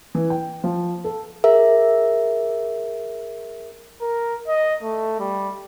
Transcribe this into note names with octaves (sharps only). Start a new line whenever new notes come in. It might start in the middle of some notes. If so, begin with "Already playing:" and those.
E3
G5
F3
A4
G#4 A#4 E5
A#4
D#5
A3
G3